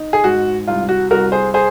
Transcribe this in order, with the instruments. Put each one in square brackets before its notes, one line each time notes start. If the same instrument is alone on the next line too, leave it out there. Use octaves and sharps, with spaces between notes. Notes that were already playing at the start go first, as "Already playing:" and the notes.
Already playing: [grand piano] D#4
G#4
G#2 F#4
C2 F4
F#4
C2 F#4 A#4
G#4 C5
G#4 C5